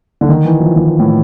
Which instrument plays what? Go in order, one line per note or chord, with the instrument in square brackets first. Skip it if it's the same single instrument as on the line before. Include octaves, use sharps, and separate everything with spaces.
[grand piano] D3
D#3
E3
F3
D#3
A2